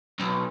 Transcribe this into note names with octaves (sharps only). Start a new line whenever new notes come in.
B1